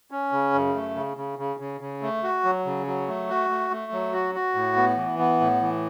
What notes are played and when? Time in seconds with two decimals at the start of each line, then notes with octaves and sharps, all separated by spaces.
0.11 C#4
0.32 C#3
0.54 F#2
0.75 A3
0.95 C#3
1.17 C#3
1.39 C#3
1.60 C#3
1.81 C#3
2.02 A3
2.23 F#4
2.44 F#3
2.66 C#3
2.87 F#3
3.08 A3
3.29 F#4
3.49 A3
3.71 A3
3.92 F#3
4.12 F#4
4.35 F#4
4.55 A2
4.76 B3
4.97 E3
5.19 B3
5.41 A2
5.61 E3